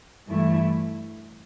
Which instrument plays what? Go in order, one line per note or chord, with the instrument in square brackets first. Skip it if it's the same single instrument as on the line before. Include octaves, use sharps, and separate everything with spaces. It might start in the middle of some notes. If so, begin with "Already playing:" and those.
[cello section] G2 E3 A3 E4